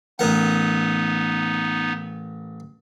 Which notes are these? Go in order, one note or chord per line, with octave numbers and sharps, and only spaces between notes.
A1 B3 D#4 A#4 F#5